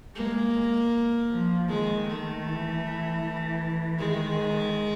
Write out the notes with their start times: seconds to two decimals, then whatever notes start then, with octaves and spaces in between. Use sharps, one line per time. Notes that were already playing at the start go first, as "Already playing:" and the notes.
0.15 G#3 A#3
1.30 F3
1.68 D#3 G#3
2.07 A3
2.45 E3
2.83 E3
3.22 E3
3.98 D#3 G#3